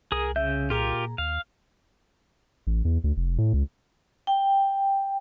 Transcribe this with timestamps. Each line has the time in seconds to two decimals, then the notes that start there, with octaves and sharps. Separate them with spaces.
0.12 C2 G#4 A#4 D#6
0.36 C#3 E5 G6
0.70 A#2 F4 G4 G#4 A#4 A#5
1.18 D#2 F5
2.67 A1
2.85 E2
3.04 D2
3.17 F1
3.38 A2
3.53 C#2
4.27 G5